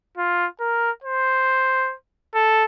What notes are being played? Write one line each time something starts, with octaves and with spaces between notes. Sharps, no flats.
F4
A#4
C5
A4